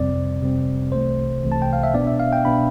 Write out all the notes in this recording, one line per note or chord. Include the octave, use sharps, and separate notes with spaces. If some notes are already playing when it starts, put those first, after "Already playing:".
Already playing: F2 C3 G3 C4 D5
F2 C3 G3 C4
C2 C3 E3 A3 C5
C2 C3 E3 A3
A5
G5
F5
E5
B2 B3 D4 D5
E5
F5
G5
B2 B3 D4 B5